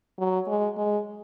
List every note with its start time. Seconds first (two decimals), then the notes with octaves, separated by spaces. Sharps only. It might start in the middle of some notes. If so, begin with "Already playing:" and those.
0.19 F#3
0.48 G#3
0.78 G#3